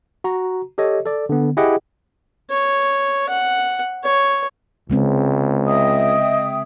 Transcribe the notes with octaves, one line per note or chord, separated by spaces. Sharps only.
F#4 A#5
G4 A4 C#5 D#5
A4 D5
D3 B3
E4 G4 G#4 D#5 F#5 G5
C#5
F#5
C#5
C#2 C#3 G#3 C4
D#5 E5 G5 D#6